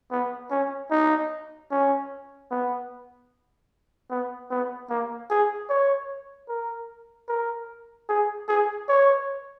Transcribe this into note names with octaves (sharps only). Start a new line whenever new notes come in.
B3
C#4
D#4
C#4
B3
B3
B3
A#3
G#4
C#5
A#4
A#4
G#4
G#4
C#5